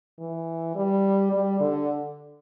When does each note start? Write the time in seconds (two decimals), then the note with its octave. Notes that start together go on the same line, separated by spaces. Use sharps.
0.19 E3
0.75 G3
1.32 G3
1.60 D3